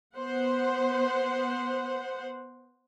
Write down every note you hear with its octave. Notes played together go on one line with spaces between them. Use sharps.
B3 C5 F#5